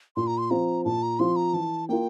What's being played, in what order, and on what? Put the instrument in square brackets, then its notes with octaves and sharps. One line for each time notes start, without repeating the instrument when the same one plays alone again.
[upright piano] A#2 [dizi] C6
[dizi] A#5
C6
[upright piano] F3 C4 F4 [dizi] A#5
[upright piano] A#2 [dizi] A5
[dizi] A#5
[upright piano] F3 C4 F4 [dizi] C6
[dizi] A#5
[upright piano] E3 [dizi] A5
[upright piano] A#3 F4 [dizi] G5